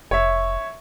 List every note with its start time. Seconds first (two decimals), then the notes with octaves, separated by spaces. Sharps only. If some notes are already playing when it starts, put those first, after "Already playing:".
0.11 F1 C#5 E5